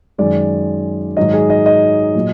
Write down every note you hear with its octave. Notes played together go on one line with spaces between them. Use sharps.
F#2 D#3 G#3 D5
G#2 D#3 F#3 D#5
G#4
D#5
D#5
A#2 F#3